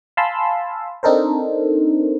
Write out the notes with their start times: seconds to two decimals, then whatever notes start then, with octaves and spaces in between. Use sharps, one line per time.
0.17 F5 G#5 A5 B5 C6 E6
1.03 C4 D4 D#4 A4 A#4 C5